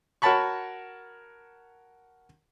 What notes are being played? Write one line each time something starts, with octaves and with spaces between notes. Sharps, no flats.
F#4 A#4 C#5 A5 B5 C#6